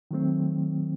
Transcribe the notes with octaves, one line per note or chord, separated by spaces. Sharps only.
D#3 F#3 A3 C4